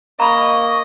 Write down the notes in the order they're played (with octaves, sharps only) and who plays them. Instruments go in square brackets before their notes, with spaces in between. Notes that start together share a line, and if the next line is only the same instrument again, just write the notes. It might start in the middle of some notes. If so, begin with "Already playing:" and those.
[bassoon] A#3 [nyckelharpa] D#5 [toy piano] A#5 B5 [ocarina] C#6